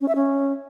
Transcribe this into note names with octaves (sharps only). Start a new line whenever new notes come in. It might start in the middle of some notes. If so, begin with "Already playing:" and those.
C#4
E5
C#4